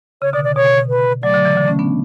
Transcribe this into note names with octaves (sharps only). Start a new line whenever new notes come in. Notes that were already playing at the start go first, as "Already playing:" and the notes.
C#3 C#5
B2 D3 D5
D5
B2 C#5
B4
F#3 A3 D5
D3 F#3
C#3 E3
D3 F#3
A3 C#4
B3 D4